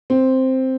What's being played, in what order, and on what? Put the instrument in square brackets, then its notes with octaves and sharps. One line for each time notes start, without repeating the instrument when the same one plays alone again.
[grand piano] C4